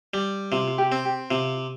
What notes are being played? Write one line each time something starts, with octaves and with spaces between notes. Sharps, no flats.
G3
C3 F4
F4
G4
C4
G4
C3 F4